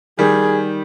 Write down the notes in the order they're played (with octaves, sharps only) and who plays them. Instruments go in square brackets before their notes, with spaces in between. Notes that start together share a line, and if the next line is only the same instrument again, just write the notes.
[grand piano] D#3 G3 [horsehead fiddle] G#4